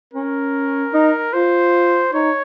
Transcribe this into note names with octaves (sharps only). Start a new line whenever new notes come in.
C#4 A#4
D#4
F4 C5
D#4 C#5